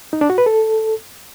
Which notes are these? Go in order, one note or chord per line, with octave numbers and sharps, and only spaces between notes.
D#4
D4
F#4
B4
A4